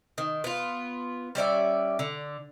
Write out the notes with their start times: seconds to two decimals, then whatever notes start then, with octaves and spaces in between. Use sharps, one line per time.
0.18 D#3
0.44 B3 F4
1.35 G3 C#4 D5 E5
1.99 D3